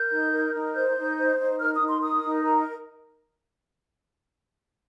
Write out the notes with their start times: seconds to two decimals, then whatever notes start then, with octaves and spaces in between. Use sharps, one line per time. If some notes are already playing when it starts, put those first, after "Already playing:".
Already playing: A#4 G6
0.11 D#4
0.33 A#4
0.53 D#4
0.75 C5 G6
0.96 D#4
1.18 C5
1.39 D#4
1.60 A#4 F6
1.74 D#6
1.81 D#4
1.88 C6
2.02 A#4 D#6
2.24 D#4
2.45 A#4 A#5